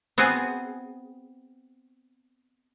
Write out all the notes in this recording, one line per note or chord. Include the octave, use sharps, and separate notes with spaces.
B3 C4 F#4 G#4